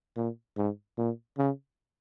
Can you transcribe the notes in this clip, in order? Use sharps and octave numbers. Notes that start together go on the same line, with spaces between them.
A#2
G#2
A#2
C#3